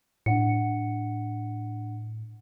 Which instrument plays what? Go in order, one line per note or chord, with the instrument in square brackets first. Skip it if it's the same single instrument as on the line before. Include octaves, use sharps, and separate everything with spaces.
[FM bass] A2 [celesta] D4 F#5 C#7